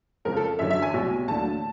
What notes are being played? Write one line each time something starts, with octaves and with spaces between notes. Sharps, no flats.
F2 C#3 F3 G#3 A#4
A4
F#2 D3 F#3 E5
E5
G#5
C2 B2 F#3
D2 D3 F#3 A#3 D4 A5